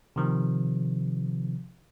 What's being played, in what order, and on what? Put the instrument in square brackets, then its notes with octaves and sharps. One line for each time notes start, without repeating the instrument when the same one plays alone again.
[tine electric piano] C3 D#3 F3